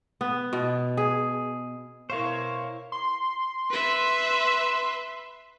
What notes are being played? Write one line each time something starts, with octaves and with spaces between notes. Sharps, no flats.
B3
B2
G#4
B2 E4 A#4 C5 C#5 F5 C#6
C6
B4 E5